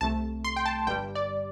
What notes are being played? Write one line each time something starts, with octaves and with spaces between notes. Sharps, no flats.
C2 C3 A3 A5
C6
G5
A5
G1 G2 G3 G5
D5